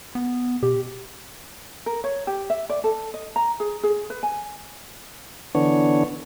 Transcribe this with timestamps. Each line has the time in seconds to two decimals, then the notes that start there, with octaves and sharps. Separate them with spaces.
0.15 B3
0.63 B2 G4
1.86 A#4
2.04 C#5
2.27 G4
2.50 E5
2.69 D5
2.84 A4
3.14 D#5
3.36 A#5
3.60 G#4
3.83 G#4
4.10 B4
4.23 G#5
5.55 D3 E3 B3 D4 C#5